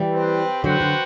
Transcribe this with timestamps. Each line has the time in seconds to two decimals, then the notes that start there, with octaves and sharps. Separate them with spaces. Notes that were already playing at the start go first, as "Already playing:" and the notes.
Already playing: E3 G3
0.13 C4 G4 B4
0.64 D3 F#3 B3 F#4 C5 G5
0.80 D3 F#3